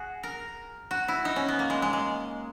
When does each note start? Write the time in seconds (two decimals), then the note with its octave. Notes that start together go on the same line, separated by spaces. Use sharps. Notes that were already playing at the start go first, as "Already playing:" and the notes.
Already playing: F#4 G#4
0.23 A#4
0.91 F#4
1.08 E4
1.25 D#4
1.36 C#4
1.48 B3
1.59 A#3
1.70 G#3
1.82 G#3
1.93 G#3